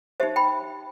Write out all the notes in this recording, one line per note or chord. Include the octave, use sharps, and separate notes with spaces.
D#4 G4 C5 E5
G5 B5